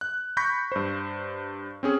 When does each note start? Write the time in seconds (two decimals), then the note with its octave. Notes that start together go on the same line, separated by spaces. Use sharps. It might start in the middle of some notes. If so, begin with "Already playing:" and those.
0.01 F#6
0.37 B5 C#6 G6 A#6 B6
0.72 G2 C5
1.83 C4 C#4 G#4